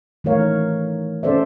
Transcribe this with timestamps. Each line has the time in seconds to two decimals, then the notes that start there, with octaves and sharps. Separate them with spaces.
0.24 D#3 E3 A3 A#4 C#5 F5
1.23 C#4 A4 C5 D5 E5